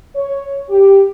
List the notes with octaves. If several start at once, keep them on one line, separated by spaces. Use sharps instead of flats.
C#5
G4